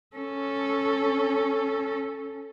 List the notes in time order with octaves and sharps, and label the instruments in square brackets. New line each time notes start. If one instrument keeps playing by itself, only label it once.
[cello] C#4 A4